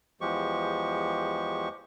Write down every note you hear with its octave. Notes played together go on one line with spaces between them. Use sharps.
E2 F3 G#3 G4 C#6